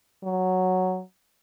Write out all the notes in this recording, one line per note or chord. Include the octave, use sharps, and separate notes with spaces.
F#3